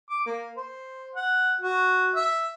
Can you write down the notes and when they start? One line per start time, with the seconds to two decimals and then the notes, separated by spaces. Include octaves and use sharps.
0.10 D6
0.26 A#3
0.57 C5
1.15 F#5
1.60 F#4
2.15 E5